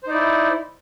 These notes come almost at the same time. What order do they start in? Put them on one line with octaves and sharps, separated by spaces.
C5 D#4 D5 E4